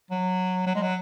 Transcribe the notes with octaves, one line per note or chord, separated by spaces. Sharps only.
F#3
F#3
G#3
F#3